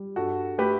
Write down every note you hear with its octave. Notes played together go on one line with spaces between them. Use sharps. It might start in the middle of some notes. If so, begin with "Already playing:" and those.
Already playing: G3
G2 F#4 A4
A3 G4 B4